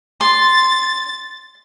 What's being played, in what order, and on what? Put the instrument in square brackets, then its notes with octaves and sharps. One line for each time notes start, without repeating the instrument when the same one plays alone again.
[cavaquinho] C6 [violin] A6